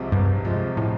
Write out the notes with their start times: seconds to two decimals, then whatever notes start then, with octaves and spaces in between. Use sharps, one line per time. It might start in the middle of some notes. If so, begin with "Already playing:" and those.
Already playing: C2 C3 F3 G#3
0.12 C2 G2
0.45 C3 F3 G#3
0.77 A2